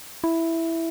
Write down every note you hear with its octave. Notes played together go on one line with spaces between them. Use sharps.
E4